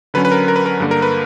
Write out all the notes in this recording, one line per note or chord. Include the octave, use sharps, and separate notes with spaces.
D3 F#3 C#4 B4
B4
A#4
A#4
B4
A#4
G2 D3 A#3
A#4
B4